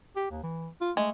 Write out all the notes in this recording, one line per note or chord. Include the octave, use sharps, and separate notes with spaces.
G4
D#2
E3
F4
G#3 A3